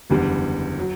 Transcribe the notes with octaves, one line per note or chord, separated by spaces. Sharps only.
F#1 E2 D3 G3
F#3